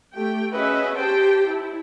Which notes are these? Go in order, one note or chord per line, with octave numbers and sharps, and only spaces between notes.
A3 G4 G5
C#4 F#4 G#4 B4 D#5 E5
G4 C5 G5 A5
E4